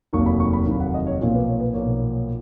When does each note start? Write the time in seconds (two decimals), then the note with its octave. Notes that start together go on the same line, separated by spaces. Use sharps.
0.13 F1 D#2 D#3 F#3 A#3 C#6
0.26 B5
0.40 C#6
0.53 B5
0.67 F1 D#2 D#3 F#3 A#3
0.80 F#5
0.94 D#5
1.07 C#5
1.20 B1 A#2 F3 A#3 C#5
1.35 B4
1.47 C#5
1.60 B4
1.74 B1 A#2 F3 A#3 C#5